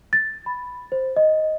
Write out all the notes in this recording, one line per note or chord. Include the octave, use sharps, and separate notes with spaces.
A6
B5
C5
D#5